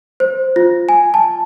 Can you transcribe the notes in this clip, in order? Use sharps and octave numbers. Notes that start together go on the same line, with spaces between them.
C5
F4
G#5
A5